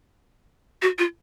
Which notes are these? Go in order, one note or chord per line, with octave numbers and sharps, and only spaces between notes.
F#4
F4